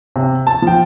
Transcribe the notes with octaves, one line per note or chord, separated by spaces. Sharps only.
C3
A5
F3 G5